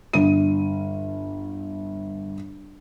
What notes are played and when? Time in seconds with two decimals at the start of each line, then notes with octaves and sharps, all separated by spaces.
0.13 G1 D#7